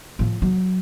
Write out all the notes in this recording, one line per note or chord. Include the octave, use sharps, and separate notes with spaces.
A2 F3
F#3